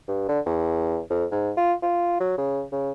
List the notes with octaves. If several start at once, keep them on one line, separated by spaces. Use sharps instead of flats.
G2
D3
E2
F2
G#2
F4
F4
F#3
C#3
C#3